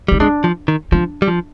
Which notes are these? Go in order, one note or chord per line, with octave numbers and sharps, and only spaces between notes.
G3 D#4
G#3 D4
F3
D#3
F3 D4
G3
F3